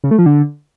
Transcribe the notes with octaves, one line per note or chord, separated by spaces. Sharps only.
C#3
A3
F3
D3